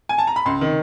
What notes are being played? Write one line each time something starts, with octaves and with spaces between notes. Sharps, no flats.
G#5
A5
A#5
B5
C#2 C6
C3 D#3